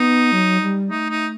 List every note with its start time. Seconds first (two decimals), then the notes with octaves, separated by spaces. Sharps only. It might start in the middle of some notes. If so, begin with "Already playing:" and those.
Already playing: B3 D#4
0.32 F#3
0.61 G3
0.90 A3 D#4
1.10 D#4